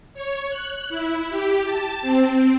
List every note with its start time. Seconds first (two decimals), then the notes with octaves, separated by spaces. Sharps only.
0.14 C#5
0.49 F#6
0.89 E4
1.29 G4
1.64 A5
2.02 C4